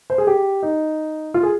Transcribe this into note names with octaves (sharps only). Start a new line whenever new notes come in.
C5
G#4
G4
D#4
F4
G#4